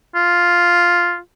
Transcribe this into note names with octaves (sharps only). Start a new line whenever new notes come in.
F4